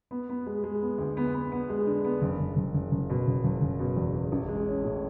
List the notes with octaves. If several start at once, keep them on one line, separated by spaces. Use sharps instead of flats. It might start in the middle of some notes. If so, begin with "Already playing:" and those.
B3
B3
G#3
G#3
B3
D2
B3
B3
B3
G#3
D3
B3
F#1
F#1
F#1
F#1
F#1
B2
F#1
F#1
F#1
B2
E2
E2
A1
G#3
C#4
A2